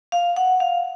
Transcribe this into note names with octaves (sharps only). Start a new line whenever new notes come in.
F5
F#5
F5